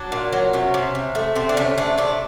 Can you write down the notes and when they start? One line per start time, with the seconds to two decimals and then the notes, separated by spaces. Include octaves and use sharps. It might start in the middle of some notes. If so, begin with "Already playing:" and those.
Already playing: F#3 D4
0.12 A#2
0.33 F#3
0.53 C3 C#4
0.74 C3
0.95 C3
1.15 A3
1.35 C3 C4
1.49 D4
1.57 C3 C#4
1.78 A3 D4
1.98 C3 D4